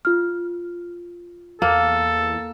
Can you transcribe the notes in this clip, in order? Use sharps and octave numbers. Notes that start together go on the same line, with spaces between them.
F4 F6
E2 A#3 A4